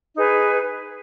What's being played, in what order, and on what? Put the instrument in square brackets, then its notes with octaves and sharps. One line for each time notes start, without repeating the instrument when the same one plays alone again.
[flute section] D#4 G#4 B4